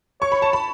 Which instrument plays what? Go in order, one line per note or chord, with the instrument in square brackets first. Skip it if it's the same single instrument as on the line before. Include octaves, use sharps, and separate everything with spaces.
[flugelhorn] C#5 [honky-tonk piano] C#6
[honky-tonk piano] B5
A5
B5